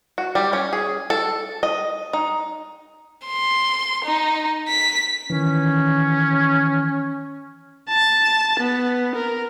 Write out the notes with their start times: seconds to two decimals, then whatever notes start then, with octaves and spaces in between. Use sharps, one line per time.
0.18 F#4
0.35 G3
0.53 C#4
0.73 G#4
1.10 A4
1.63 D#5
2.13 D#4
3.26 C6
4.05 D#4
4.69 B6
5.30 D#3 E3 C#4
7.89 A5
8.60 B3
9.15 A#4